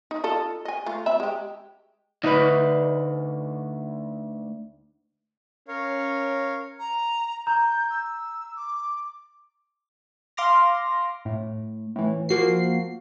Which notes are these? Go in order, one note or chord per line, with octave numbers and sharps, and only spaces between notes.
D#4
F4 A4 D#5
D#5 G#5
A3 F4
C4 E5 B5
G#3 G4
D2 D#4 B4
C#4 A#4 C#5 F5
A#5
A#5 G6
E6
D6
F5 C6 D6 F6 A#6
A2
A2 E3
F3 A#3 F#4 C7